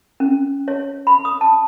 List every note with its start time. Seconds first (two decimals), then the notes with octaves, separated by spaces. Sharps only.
0.20 C#4
0.68 C#5
1.07 B5
1.25 D#6
1.41 A5